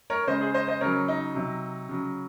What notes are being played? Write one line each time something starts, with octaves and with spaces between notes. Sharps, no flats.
A#4 C#5
C#3 G#3 C5 D#5
G#4 C5
C5 D#5
C5 D#5
C#3 F#3 A#4 C#5
D#4
C3 F#3
C#3 F#3